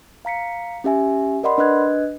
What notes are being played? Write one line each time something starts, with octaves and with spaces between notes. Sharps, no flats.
F5 A#5 B6 C#7
C#4 G4 E5 G#5
A#4 D5 D#5 F#5 B5 C6
D4 B4 D#5 F#6 G#6